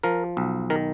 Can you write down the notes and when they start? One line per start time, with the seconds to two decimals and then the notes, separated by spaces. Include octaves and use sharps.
0.03 F3 A#4
0.37 B1
0.70 D#3 A#4